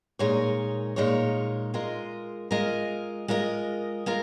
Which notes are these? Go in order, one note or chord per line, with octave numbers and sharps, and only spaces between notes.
A#2 G#3 D#4 A#4 C#5
A#2 G#3 D#4 A#4 C#5
G#3 F4 A#4 D#5
G#3 F4 A#4 D#5
G#3 F4 A#4 D#5
G#3 F4 A#4